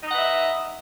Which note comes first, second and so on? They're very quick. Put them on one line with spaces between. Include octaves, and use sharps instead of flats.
D#4 D#5 F#5 B4 E5